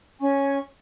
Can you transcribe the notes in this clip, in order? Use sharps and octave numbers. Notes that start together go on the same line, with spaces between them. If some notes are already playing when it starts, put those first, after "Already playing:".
C#4 G#5 C#6